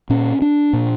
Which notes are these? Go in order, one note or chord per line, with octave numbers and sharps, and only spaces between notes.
A#2 C#4
D4
A#2